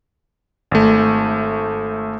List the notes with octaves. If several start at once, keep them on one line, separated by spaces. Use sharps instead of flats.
G#1 A3